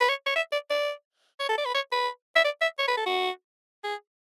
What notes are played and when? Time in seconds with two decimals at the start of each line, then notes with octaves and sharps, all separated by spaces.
0.01 B4
0.09 C#5
0.26 C#5
0.36 E5
0.52 D5
0.70 D5
1.40 C#5
1.49 A4
1.58 D5
1.65 B4
1.74 C#5
1.92 B4
2.36 E5
2.44 D5
2.61 E5
2.79 C#5
2.87 B4
2.97 A4
3.06 F#4
3.84 G#4